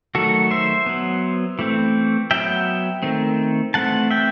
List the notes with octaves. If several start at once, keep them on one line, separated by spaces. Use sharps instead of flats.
D#3 F#3 A3 F#4 A4
C5 E5
F#3 B3
E3 A3 C4
F#3 B3 E5 G5
D#3 A3 C4
E3 A3 C4 F#5 A5
E5 G5